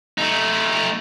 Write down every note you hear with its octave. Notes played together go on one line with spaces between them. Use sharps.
A3 D#4